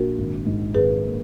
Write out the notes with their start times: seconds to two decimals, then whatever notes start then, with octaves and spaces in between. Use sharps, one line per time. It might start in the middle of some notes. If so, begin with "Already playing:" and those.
Already playing: A#1 F#4 A#4
0.18 G#1
0.46 G#2
0.75 G#1 G#4 B4
1.04 A#3